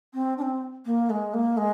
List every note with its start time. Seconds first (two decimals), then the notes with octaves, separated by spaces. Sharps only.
0.14 C4
0.37 D4
0.42 C4
0.86 A#3
1.10 G#3
1.34 A#3
1.57 G#3